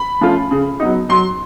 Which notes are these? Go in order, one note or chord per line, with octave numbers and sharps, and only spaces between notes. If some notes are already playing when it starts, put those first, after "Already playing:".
Already playing: B5
F3 A3 C#4 F4
C#3
F#3 B3 D#4
F#3 C6